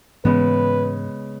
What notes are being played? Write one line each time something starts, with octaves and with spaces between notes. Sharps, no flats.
G#2 C#3 E3 G#3 B3 C#4 B4